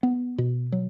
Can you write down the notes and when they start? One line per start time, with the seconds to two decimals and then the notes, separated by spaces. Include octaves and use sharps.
0.03 B3
0.38 B2
0.72 F#3